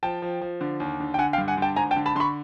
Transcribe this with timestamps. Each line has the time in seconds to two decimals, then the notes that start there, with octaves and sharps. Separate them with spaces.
0.03 F3 G5 A5
0.22 F3
0.41 F3
0.61 D3
0.80 D#2
1.00 D3
1.14 G5
1.18 D3 F#5 G#5
1.33 F5 G5
1.38 G2
1.48 F#5 G#5
1.57 D3 G5 A5
1.76 G#1 G#5 A#5
1.91 G5 A5
1.96 D3
2.06 A5 B5
2.15 D3 C6
2.20 B5 C#6